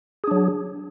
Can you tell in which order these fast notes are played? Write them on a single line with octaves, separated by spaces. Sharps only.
G#4 D4 F#3